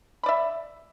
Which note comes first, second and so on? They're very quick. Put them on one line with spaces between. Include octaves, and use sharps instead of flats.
B5 D5 E5